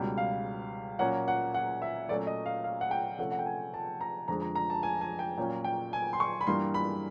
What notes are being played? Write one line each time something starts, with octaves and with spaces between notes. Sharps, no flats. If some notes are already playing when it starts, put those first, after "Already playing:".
Already playing: C#2 B2 G3
F5
A#2 F#3 A#3 C#4 F#5
F#5
F#5
E5
A#2 F#3 A3 C#4 D5
D#5
F5
F5
F#5
G5
C3 F3 A3 C#4 F#5
F#5
G5
G#5
A5
A#5
F2 D3 F3 G#3 A#5
A#5
A#5
A5
G#5
G#5
G5
A#2 F#3 A#3 C#4 G5
G5
G#5
C6
C#6
B5
G2 E3 G3 A#3 C6
B5